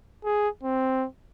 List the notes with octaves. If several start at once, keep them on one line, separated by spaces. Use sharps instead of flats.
G#4
C4